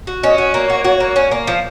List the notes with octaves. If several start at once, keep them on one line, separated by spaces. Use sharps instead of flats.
F#4
C#4 D#5
F#4 C#5
A#3
F#4
F#4
A#3
C#4
A#3
F3 F5